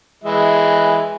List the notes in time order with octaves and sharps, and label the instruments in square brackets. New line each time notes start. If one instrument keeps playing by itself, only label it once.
[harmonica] E3 G#3 E5